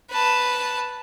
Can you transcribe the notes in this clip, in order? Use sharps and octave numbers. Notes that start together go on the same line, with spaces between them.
B4 A5